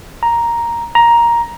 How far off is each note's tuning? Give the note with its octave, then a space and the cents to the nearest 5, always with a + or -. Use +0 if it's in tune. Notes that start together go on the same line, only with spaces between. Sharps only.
A#5 +5
A#5 +10